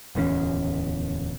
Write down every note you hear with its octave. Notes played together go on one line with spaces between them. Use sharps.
D1 E2 G3 C#4